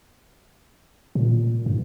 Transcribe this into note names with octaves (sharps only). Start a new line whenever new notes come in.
A#2
G2